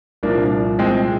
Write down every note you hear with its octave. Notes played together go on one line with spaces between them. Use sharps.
C2 A#2 F3 A#3 D4
G#3 C4